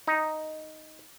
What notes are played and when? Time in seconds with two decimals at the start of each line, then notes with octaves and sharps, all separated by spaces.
0.07 D#4